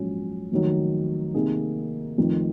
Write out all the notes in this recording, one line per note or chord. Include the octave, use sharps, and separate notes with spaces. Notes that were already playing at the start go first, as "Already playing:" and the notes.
Already playing: A#1 G#2 F#3 C#4
F1 D#2 D#3 F#3
C3 D#3 A#3 D#4 G#4
F1 F2 D#3